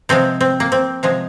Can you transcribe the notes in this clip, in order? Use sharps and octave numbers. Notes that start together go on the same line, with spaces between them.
C3 F3 G#3 C4
C4
A#3
C4
C3 F3 G#3